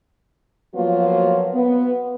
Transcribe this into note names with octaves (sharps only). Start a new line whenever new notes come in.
F3 F#3 A#3 B3 F4 F#4
B3